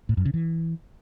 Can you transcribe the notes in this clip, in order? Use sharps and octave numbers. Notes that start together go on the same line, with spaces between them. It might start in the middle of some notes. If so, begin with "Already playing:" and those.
A2
F#2
C#3
E3